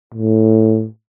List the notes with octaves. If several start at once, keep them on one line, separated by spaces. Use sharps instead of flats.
A2